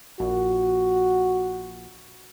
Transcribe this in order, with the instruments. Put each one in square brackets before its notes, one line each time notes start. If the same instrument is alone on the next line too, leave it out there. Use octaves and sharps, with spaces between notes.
[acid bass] A#1 [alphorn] F#4